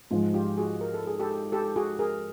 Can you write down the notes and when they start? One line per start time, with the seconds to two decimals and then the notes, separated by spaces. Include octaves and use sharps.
0.11 G#2 F3 G#3 F4
0.34 F4 G4
0.57 F#4 G#4
0.81 A#4
0.94 A4
1.07 G#4
1.20 G4 A4
1.52 G4 A4
1.76 F#4 G#4
1.99 G#4 A#4